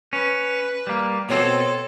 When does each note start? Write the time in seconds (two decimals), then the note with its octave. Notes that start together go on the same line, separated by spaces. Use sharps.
0.13 C#4 B4
0.87 G3 A#3
1.29 B2 C4 A4 C#5